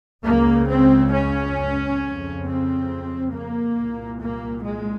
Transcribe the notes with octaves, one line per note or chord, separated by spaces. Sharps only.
C#2 C#3 A#3
C4
C#4
F2 C#3
C4
A#3
C2 A#2
A#3
G#3